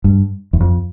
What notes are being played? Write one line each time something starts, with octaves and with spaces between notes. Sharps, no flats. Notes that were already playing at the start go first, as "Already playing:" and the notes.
G2
E2
F2